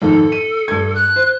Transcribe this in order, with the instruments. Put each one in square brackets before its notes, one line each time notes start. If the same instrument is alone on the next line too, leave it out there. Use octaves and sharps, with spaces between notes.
[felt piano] F2 G#2 D#3 [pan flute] A4
[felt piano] D#7
G2 G#6
[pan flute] F#6
[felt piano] C5